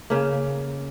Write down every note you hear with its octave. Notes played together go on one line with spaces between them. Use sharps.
C#3 A#3